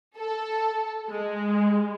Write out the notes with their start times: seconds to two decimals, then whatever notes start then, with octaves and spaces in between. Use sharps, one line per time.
0.16 A4
1.09 G#3